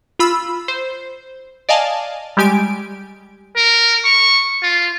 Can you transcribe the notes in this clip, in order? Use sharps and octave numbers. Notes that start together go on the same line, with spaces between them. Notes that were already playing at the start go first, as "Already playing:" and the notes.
F4 B5 E6
C5
D5 D#5 F5 G#5 A5
G3 G#3 G4 G#5 D7
A#4
C#6
F4